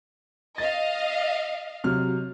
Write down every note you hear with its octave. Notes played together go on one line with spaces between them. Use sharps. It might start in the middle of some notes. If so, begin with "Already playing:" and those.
D#5 F5 A6
C3 F#3 F6